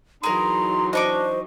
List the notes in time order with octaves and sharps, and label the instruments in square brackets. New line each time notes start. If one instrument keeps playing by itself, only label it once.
[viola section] E3 F#3 D#4 [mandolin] G#4 A#4 [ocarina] A#5 [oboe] C6
[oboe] D4 [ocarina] C5 [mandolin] D#5 C#6 D6